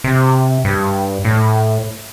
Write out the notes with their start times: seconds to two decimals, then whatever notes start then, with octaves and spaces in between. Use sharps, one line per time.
0.04 C3
0.65 G2
1.25 A2